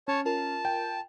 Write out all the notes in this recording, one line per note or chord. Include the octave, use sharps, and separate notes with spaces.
C#4 C#5 A5
F4 A#4 A5
G5